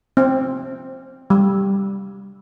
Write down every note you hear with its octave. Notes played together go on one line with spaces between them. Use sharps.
C4
G3